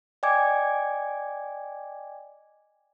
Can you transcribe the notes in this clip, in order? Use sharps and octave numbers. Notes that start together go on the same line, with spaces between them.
D5 D#5 G5 G#5 D6 G#6